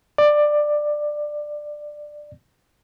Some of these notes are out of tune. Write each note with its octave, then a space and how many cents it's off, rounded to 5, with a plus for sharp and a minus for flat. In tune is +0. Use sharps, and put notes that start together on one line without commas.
D5 +15